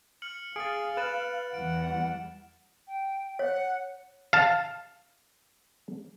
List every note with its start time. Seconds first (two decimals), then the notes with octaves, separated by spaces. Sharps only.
0.22 F6 C#7 F#7
0.56 G#4 F5 A6 D7
0.97 B4 A6 E7 F#7
1.54 E2 E3 G3 F#5 D7
2.87 G5
3.39 C#5 F#5
4.33 F5 A5